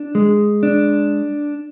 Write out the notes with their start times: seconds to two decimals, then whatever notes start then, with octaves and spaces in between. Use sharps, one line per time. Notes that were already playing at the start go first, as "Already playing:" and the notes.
Already playing: D4
0.15 G#3
0.63 D4